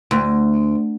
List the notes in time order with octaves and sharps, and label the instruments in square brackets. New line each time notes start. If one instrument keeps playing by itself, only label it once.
[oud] D2